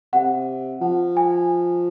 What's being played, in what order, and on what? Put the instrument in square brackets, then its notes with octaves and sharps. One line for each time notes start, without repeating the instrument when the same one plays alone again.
[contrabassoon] C3 [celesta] F#5
[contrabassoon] F3 [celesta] F#5
[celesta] G#5